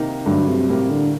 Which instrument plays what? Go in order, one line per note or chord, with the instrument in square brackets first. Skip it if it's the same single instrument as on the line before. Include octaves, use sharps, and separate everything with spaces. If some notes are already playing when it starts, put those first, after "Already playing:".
Already playing: [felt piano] C3 D#3 A#3 D#4
[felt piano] G2 F#3 A3 [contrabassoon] D3
[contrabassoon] C3
[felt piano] A2 G3 A#3 [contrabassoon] C3
[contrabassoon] D3